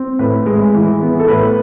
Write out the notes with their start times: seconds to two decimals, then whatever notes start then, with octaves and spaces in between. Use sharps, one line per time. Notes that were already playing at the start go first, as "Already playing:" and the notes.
Already playing: C4
0.19 A2 B4
0.46 G#3
0.74 E3
1.01 B3
1.19 A4
1.28 A2 B4